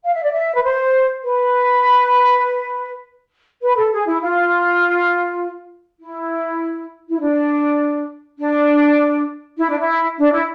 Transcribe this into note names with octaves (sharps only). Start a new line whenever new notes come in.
F5
E5
D5
E5
B4
C5
B4
B4
A4
G#4
E4
F4
E4
E4
D4
D4
E4
D4
E4
D4
E4